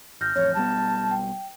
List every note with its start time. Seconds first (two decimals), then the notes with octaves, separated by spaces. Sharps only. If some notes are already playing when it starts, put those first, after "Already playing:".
0.21 G#1 F6 G6 A#6
0.36 A1 F2 C#5
0.55 B1 G3 B3 A5
1.11 G5